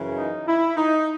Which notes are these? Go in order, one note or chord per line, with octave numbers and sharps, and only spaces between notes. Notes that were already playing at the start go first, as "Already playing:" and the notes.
Already playing: F#2 C#3 E3
D#4
E4
D#4